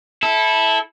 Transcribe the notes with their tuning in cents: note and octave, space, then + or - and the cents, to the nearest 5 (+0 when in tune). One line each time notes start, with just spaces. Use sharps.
E4 -15 A4 -10